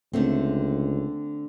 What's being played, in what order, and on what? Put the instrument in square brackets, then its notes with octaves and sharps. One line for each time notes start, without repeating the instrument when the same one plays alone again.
[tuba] C#2 [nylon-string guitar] D3 A3 C4